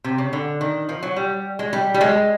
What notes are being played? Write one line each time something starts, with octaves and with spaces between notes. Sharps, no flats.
C3
C#3
D3
D#3
F3
F#3
G3
G#3
G3
G3
G#3